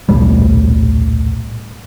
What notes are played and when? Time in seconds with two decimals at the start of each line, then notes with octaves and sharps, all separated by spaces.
0.09 D#1 B1 A2 G3